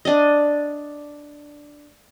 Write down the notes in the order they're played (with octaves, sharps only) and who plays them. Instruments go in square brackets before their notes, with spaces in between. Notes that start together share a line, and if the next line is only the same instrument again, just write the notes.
[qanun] D4 D#5